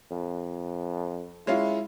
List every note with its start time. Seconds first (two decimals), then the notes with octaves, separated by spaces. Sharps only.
0.11 F2
1.47 G#3 C#4 E4 F4